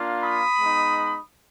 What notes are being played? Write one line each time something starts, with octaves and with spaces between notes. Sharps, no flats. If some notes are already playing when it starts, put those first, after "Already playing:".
Already playing: A#3 D4 F4
B5 D#6
G#3 B3 D#4